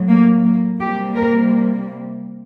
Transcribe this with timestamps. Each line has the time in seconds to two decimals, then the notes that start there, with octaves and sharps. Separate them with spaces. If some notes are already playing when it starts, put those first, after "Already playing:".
Already playing: A2 F#3
0.09 A#3
0.44 A#3
0.80 C3 G3 A#3 G4
1.15 A#4